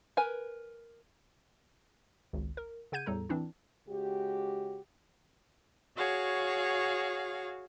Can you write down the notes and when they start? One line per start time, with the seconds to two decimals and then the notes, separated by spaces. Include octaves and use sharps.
0.17 A#4 B4 G#5
2.33 G#1 C#2
2.57 A#4
2.92 C#3 G#4 F#5 G6 G#6 D#7
3.06 E2 A2 G3 A4 A#5
3.29 E3 C4 D4 E4
3.88 C#3 G#3 F#4 G4
5.95 F#4 G#4 C#5 F5